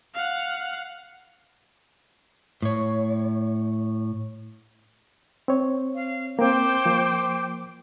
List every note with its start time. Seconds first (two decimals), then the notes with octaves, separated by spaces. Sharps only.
0.14 F5 F#5
2.62 A2 C#5
5.48 C4 C#5
5.94 F5
6.39 A#3 C4 C5 G5 D6
6.86 F3 A#3